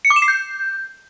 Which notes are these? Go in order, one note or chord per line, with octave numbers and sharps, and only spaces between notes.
C#7
D6
E7
C7
G6